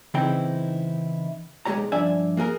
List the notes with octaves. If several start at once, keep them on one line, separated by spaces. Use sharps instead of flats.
C#3 E3 C4 D#4 E4 G5
B1 G#3 A3 G4 C#5 A#5
G2 F3 D4 D5 E5 G#5
A#3 F#4 G#4 A#4